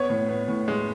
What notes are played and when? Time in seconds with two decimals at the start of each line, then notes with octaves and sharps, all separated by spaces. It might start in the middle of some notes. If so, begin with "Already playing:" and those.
Already playing: B3 C#5
0.10 A2
0.28 B3
0.48 A2
0.68 G#3